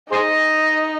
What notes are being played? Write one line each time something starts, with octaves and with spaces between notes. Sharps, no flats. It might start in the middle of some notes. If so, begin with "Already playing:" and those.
D#4 G#4 C5 D#5